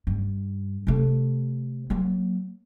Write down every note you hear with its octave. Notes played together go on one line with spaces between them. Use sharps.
G2
C3 A3
F#3 A#3